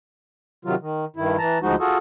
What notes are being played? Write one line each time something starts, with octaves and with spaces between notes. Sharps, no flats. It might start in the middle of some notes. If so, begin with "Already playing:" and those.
C3 D#3 F#3 F4
D#3
G2 D#3 E4
E3 A5 A#5
D2 F3 G#3 D#4 F#4
F4 F#4 G#4 A4